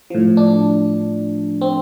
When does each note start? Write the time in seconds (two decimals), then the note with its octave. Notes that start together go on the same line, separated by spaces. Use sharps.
0.10 A2 F3
0.37 D4
1.61 C4